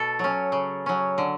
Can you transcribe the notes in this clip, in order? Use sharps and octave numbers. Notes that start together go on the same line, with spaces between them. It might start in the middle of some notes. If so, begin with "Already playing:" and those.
Already playing: B2 A4
F#3 C#4
C#3
F#3 C#4
D3